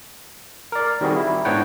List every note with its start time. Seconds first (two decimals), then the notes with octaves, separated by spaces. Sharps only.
0.72 A#4 D5
1.01 D#3 G3 C4 F#4 G#4
1.16 E4
1.45 G#2 B3 D4 C#5 F#5 G5